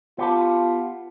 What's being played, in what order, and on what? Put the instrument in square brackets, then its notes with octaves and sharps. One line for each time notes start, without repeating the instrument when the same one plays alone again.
[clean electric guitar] B3 G4 A5 [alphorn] F4